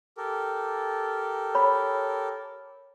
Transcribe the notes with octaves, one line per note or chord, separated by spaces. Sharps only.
G4 A4 A#4
C#5 B5